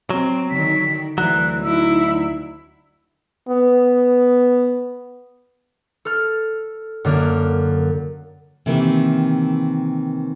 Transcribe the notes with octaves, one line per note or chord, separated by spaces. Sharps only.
F#3 C4
D3 D#3 B6
D2 E3 F#3 F#6
D#4 E4 E6
B3
A4 F6
F#2 D3 A#3
C3 D#3 E3 A#3